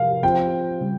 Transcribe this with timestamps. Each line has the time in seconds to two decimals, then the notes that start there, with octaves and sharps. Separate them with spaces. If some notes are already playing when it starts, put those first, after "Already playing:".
Already playing: C3 F3 A#4 F5
0.23 F3 C4 F4 C5 G5
0.81 C#3 G3